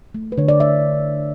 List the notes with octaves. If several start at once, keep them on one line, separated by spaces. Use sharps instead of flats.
A3
B4
D3 C#5
D5
A3 E5